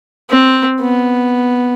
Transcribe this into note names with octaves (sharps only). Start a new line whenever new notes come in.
C4
B3